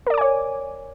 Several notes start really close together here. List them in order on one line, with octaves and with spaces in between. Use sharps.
A#4 D5 D6 G#5 C#5